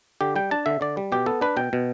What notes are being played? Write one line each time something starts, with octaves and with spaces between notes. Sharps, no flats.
D3 G4
G3 G5
D4 A5
D3 E5
D3 D5
G3
B2 G4
B3 A4
D4 B4
B2 G5
B2